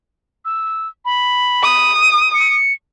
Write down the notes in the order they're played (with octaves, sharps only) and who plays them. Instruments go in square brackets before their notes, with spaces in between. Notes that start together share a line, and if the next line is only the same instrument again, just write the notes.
[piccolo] E6
B5
[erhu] D#6
[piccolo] C#7